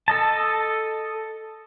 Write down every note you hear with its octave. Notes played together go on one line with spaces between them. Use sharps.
A4 D#5 A5